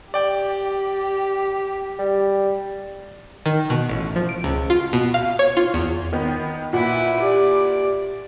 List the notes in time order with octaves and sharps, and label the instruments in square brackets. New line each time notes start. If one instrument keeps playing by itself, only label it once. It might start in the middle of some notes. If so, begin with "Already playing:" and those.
[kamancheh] G4 [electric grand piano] D5 G5 D6
[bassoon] G3
[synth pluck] D#3
B2
A1
F3
D7
C#2
F4
B2
F5
C#5
F4
E2
[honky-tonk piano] D#3 B3
[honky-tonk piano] A#2 F#5 [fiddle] E4 B4
[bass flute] G4 [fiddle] D5